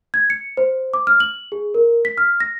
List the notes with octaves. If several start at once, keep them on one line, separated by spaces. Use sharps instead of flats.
G#6
C#7
C5
D6
F6
F#7
G#4
A#4
B6
F6
A#6